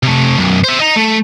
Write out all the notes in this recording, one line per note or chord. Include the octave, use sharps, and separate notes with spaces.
C3 A3
B1 F#2
C5 E5
D#5 A#5
A3